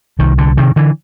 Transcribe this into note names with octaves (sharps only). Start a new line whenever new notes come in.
C2 D#3
D3
C3 D#3
D3 E3